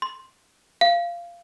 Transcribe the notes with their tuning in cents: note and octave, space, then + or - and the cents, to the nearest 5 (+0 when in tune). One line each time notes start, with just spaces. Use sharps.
C6 +5
F5 -15